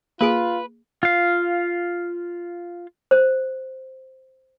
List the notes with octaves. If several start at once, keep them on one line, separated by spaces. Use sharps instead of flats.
A#3 F4 G#4 B4 D7
F4 F5
C5